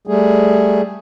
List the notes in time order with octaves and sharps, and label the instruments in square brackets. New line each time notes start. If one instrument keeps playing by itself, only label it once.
[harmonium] G3 A3 G#4